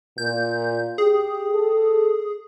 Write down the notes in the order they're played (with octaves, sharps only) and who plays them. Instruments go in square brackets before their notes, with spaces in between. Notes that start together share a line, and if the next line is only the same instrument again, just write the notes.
[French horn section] A#2 [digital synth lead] G6
[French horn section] G4 [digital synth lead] G#4
[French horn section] A4